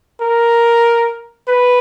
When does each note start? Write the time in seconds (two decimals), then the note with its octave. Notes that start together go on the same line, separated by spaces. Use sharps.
0.21 A#4
1.48 B4